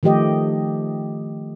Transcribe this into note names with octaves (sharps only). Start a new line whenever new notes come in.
D#3 F3 A3 G4 D#5